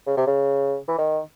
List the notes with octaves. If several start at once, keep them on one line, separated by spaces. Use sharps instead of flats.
C#3
C3
C#3
E3
D#3